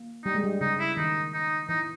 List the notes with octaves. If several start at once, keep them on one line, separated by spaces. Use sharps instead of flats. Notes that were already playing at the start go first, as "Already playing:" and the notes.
Already playing: A#3
G3 D#4
G#3
G3
C#3 D#4
E4
D#3 D#4
D#4
E3 D#4